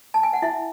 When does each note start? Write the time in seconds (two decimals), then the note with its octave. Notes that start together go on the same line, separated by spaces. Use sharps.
0.14 A5
0.23 G#5
0.33 F#5
0.42 E4 E5